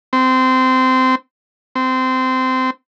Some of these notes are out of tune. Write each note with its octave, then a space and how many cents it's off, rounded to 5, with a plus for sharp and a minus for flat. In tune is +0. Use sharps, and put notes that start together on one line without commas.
C4 -20
C4 -20